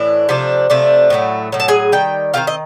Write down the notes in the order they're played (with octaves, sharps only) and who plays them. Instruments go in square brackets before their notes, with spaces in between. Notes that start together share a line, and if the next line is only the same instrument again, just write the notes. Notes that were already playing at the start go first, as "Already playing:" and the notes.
Already playing: [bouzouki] A2 E3 D4
C3 F3 A3 D4
C3 F3 A3 D4
A2 F#3 A3
A2 F#3
A5
G#4 G#5
D#3 G3 G5
D#3 G3 C4 F4 F5
D#5